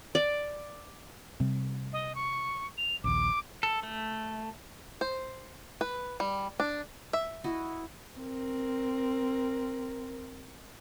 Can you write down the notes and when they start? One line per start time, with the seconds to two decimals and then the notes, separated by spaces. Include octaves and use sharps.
0.15 D5
1.40 C3 G3 C4
1.93 D#5
2.15 C#6
2.78 F7
3.04 A#1 D#2 D6
3.63 A4
3.83 A3
5.01 C5
5.81 B4
6.20 G3
6.60 D4
7.13 E5
7.44 E4 F#4 D#5
8.19 C4 A#4